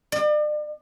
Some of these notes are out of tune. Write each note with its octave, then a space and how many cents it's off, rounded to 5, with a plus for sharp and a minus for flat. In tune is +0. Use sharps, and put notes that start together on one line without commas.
D5 +40